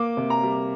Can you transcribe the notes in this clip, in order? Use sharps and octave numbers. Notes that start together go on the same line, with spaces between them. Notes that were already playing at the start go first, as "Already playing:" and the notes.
Already playing: A#3 D6
C3
A#5
G3